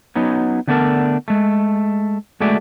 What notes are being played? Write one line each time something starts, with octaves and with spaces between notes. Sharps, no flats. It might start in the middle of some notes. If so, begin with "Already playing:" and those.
F#3 B3 C#4 D#4
D3 A3 B3 D4 A4 A#4
G#3 A3
G#3 A3 F#4 G#4 D5 E5